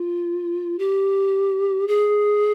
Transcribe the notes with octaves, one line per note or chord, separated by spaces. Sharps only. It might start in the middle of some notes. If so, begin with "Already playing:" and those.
Already playing: F4
G4
G#4